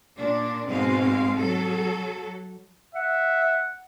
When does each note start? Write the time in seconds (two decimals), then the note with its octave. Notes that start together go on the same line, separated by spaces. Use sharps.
0.16 A#2 D4
0.66 G#2 B2 G#3 C4 F5
1.36 F#3 A4
2.95 E5 F#5